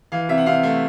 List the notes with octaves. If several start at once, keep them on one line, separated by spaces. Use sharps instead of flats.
E3 F5
C3 E5
F#5
C3 F5
A3 F5